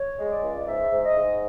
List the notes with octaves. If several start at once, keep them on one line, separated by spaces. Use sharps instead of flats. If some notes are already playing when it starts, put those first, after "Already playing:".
Already playing: C#5
G#3
D5
C#2
G#2 E5
G#2
D#5
G#2